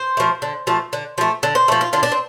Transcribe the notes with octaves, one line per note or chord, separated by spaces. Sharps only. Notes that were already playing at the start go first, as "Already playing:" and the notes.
Already playing: C5
F3 A3
D3
F3 A3
D3
F3 A3
D3
C5
F3 A3
F4
D3 F4
D4
C4